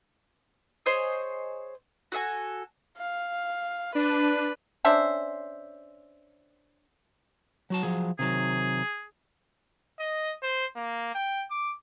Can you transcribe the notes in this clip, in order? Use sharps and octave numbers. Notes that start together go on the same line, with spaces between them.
G#4 C5 C#5 D#5
F#4 A4 E5 G#5
F5
D4 B4
C#4 D4 C5 E5
F#3 F#4 A5
F3 F#3 G#4
C3 D#3 F#3 G#4
D#5
C5
A#3
G5
D6